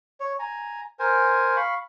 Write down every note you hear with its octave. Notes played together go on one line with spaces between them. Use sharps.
C#5
G#5 A#5
A#4 C5 G#5
F5 B5 C#6